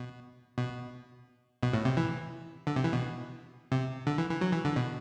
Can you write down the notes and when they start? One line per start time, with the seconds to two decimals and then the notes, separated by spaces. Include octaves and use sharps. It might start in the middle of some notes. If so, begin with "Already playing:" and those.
Already playing: B2
0.57 B2
1.63 B2
1.73 A2
1.85 C3
1.97 E3
2.67 D3
2.76 C3
2.84 E3
2.93 B2
3.72 C3
4.07 D3
4.18 E3
4.30 E3
4.41 F#3
4.53 E3
4.65 D3
4.76 B2